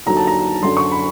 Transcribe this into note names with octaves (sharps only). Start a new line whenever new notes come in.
D#2 D3 F#3 A#5
A5
A#5
F#2 D3 F#3 C6
C#6
B5